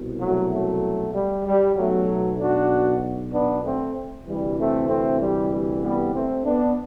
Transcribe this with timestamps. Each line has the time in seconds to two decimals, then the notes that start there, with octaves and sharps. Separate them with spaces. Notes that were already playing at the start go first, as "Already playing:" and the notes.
Already playing: C2 B2
0.20 F#3 A3
0.52 F#3 A3
1.14 G3
1.45 G3
1.76 B1 B2 F#3 A3
2.39 D4 F#4
3.32 B3 D4
3.63 A3 C4
4.26 D2 C3 E3 G3
4.57 A3 C4
4.88 A3 C4
5.20 G3
5.51 G3
5.82 G3 B3
6.13 A3 C4
6.45 B3 D4